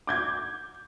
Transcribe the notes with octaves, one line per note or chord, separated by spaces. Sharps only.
D6 G6 G#6